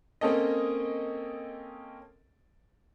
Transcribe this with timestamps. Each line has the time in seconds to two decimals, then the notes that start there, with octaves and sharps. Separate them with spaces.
0.21 A#3 C4 C#4 A4 D#5